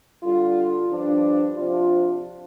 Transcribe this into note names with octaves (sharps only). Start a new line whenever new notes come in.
D3 G3 D4 F4
G2 F3 D4
C3 F3 D4 F4